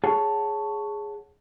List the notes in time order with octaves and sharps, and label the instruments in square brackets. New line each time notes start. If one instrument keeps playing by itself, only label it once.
[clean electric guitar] G#4 C#5 F#5 A5